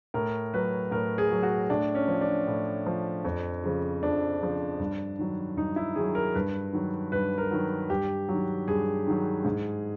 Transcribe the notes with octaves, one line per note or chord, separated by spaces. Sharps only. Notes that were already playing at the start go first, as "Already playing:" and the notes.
A2 A#4
F#3 B4
A2 A#4
G#4
F#3
F#4
A2 D4
C#4
F3
D4
A2
F3
F2
C#3 F3
F2 D4
C#3 F3
G2
D#3 F#3
G2 D#4
E4
D#3 F#3 G#4
A#4
G2 B4
D#3 F#3
G2 B4
A#4
D#3 F#3
G2 G4
D#3 F#3
G2 G#4
D#3 F#3
G#2